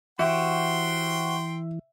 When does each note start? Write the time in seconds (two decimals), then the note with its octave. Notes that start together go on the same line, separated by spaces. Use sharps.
0.19 E3 F#4 G4 C5 E5 G5 C6